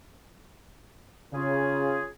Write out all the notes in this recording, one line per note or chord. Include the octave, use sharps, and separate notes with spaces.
C#3 C#4 F4 G#4